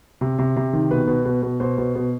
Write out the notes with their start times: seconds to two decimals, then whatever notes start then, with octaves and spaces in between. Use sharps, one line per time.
0.21 C3
0.39 C3
0.56 C3
0.73 D#3
0.91 B2 B4
1.08 B2
1.25 B2
1.43 B2
1.60 B2 C5
1.78 B2
1.95 B2